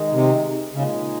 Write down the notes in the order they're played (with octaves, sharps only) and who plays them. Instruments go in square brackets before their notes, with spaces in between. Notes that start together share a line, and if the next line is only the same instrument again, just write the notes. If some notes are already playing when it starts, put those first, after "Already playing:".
Already playing: [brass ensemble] D#3 G#3 D#4
[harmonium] C3
[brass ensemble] A#2 G#3 D#4 [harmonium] C#3